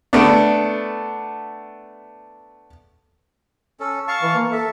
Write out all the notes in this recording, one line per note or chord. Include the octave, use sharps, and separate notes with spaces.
A3 B3 D4
C#4 A4
F5 A5 C#6
E3
A#3
A4 E5